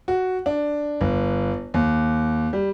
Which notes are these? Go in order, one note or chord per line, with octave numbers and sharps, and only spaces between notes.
F#4
D4
G1
D#2
G3